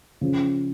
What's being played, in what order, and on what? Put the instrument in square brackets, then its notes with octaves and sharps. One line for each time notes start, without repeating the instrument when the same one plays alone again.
[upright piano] C#3 F3